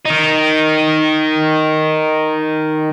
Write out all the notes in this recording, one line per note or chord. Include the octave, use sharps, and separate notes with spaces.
D#3 D#4